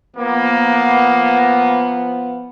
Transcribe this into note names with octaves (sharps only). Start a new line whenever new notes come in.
F3 A#3 B3